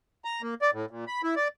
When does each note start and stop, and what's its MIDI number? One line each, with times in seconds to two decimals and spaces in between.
0.25 0.42 82
0.42 0.54 58
0.62 0.71 74
0.73 0.86 45
0.91 1.05 46
1.08 1.21 83
1.23 1.35 64
1.36 1.48 74